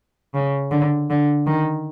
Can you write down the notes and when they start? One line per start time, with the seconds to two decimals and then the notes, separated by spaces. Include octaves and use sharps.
0.34 C#3
0.71 D3
1.10 D3
1.46 D#3